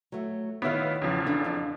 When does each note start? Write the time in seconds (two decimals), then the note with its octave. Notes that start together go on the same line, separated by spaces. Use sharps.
0.12 F#3 A3
0.62 D#3 B3 E4 F4 C#5
1.02 E2 C#3 F3
1.27 D4 A4
1.44 F2 D4